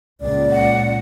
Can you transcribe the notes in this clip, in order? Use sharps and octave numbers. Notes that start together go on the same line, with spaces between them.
C#2 A#2 D5
F#5